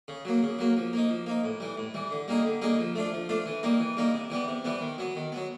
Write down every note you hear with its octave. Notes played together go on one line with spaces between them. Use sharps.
C#3
F#3 A#3
C#3
F#3 A#3
F3
A#3 D#4
F3
A#3 D#4
A2
E3 G3
A2
E3 G3
D3
G3 A#3 D#4 G#4
D3
G3 A#3 D#4 G#4
F3
A3 D4 F4
F3
A3 D4 F4
E3
G3 A#3 D#4
E3
G3 A#3 D#4
C3
E3 G3 B3
C3
E3 G3 B3
D#3
F#3 B3
D#3
F#3 B3